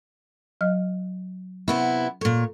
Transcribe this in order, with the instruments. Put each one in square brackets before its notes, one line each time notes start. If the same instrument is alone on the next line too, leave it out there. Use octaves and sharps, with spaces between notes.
[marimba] F#3 D#5 F6
[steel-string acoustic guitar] C3 B3 E4 [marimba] C#6
[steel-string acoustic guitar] A#2 C#5 [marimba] A4